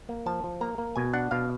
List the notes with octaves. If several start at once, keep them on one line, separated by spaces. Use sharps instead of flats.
A#3
F3 A5
F3
A#3 A#5
A#3
B2 G#5
D4 F#5
B2 F5